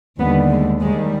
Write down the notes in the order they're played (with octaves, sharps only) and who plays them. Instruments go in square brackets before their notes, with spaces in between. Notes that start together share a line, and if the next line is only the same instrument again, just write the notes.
[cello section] D#2 D3 G3 B3
G#3
D#2 D#3 G3 G#3